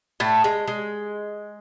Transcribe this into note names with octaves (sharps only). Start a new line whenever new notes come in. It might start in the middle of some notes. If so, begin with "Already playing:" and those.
A2 A3
G#3
G#3